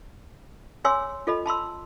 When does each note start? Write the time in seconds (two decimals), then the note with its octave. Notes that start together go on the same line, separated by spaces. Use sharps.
0.84 G#4 C#5 G#5 C6 E6
1.27 F4 A4 D#5 B5
1.46 A5 B5 C6 E6